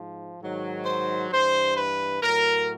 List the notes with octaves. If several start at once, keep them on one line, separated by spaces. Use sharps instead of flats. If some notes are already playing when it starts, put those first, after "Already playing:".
Already playing: G#2 F3
G#2 D#3 F#3
C5
G2 E3 C5
B4
A2 F#3 A#4